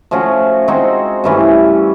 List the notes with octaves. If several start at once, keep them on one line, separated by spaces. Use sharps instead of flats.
F3 A3 C#4 F#4
G#3 C4 D#4 F#4
G2 E3 A3 C#4